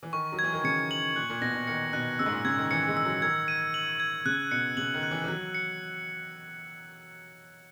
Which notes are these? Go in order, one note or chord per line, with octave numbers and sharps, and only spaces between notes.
E3
D#3 C#6
F#3
E3 G#6
D#3
C#3 C#7
F#7
A#2 F#6
A#2
B2 A#6
B2
D#3 C#7
B2 F#6
C#3 E6
G#2
A#2
C#3 G#6
D#3
E3 C#7
G#3
E6
F#3
D#3 G#6
D#7
F#7
G#6
C#3 F#6
B2 C#7
C#3 F#7
D#3
F#6
E3
E3
F#3 F#6
C#7